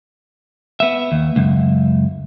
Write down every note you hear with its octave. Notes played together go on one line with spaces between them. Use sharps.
B3 E5
D#2
C#2 F#2